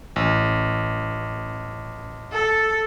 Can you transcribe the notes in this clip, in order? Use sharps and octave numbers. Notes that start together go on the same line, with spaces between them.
A1
A4